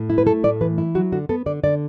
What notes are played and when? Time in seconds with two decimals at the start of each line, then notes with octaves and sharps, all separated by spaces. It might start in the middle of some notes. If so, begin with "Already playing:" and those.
Already playing: A2
0.10 E4
0.18 B4
0.26 A3 A4
0.44 A2 D5
0.61 E3 B4
0.78 E4
0.95 F#3 F#4
1.12 D3 F#4
1.29 B3 A4
1.46 D3 D5
1.63 D3 D5